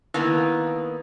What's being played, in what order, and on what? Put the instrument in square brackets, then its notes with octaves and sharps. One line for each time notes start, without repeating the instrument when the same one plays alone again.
[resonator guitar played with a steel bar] D#3 A#3 B3 [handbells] E4 B4 E6